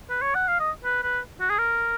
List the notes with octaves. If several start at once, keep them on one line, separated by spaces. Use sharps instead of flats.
B4
C#5
F#5
F5
D#5
B4
B4
F#4
G#4
A#4